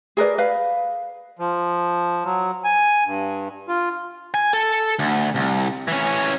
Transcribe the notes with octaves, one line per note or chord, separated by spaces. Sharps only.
G#4 A#4 B4 D5
B4 F5
F3
F#3
G#5
G2
F4
G#5
A4
D2
C2
E3 C#4